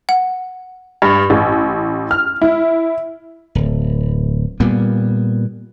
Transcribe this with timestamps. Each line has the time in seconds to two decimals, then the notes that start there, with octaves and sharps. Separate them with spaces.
0.09 F#5
1.02 G2
1.30 A1
2.11 F6
2.42 E4
3.55 D1
4.60 A#2 G3 A#3 B3